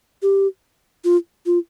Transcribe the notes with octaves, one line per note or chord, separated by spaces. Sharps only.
G4
F4
F4